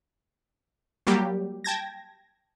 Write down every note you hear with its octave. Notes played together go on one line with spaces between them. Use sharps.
F#3 G3 A#3 G4
G5 A5 G#6 A#6